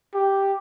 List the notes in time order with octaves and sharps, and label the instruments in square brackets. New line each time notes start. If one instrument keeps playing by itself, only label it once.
[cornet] G4